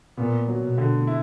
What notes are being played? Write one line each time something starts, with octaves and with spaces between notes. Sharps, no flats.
A#2 B3
F#3
B2
D3
E4